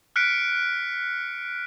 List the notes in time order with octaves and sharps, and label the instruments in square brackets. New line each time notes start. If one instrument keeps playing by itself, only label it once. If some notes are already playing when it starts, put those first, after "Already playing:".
[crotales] F6 F#6 B6 C#7 D7